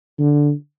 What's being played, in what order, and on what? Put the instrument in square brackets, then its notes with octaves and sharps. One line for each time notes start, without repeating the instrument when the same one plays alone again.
[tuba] D3